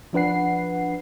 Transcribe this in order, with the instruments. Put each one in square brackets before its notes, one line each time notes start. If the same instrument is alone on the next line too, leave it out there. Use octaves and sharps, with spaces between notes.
[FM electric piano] F3 D4 B4 F#5 C7